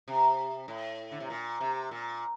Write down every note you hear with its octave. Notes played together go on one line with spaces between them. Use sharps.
C3
A2
D3
C3
A#2
C3
A#2